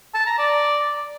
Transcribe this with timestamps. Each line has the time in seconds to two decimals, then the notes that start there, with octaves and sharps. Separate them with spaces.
0.15 A5
0.27 A#5
0.39 D5